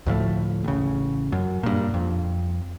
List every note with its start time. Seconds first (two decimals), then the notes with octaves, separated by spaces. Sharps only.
0.06 D2 A2 F3 A3
0.64 A1 C#3
1.32 F#2
1.63 G2 A#2
1.94 F2